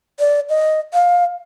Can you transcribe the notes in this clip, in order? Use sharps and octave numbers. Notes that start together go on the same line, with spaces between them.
D5
D#5
F5